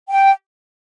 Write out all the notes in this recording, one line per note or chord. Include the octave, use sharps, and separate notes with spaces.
G5